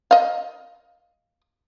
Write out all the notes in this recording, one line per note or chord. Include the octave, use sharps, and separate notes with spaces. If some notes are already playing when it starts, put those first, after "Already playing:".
D#5 F5